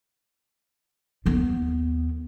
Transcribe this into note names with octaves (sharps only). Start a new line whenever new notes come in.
D#2 B3